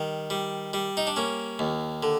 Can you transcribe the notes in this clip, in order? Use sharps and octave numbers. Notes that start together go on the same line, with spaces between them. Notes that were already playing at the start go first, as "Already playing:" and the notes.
Already playing: D#3 G3
G3
G3
D#4
D4
A#3 C#4
D#2
D3